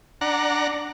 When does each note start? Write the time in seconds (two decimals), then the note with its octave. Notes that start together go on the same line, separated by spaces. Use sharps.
0.21 D4 F#5 A#5